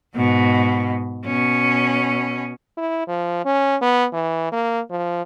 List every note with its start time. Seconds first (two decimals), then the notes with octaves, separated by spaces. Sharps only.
0.15 G#2 B2
1.26 B2 C#4
2.77 E4
3.08 F3
3.45 C#4
3.82 B3
4.13 E3
4.52 A#3
4.91 F3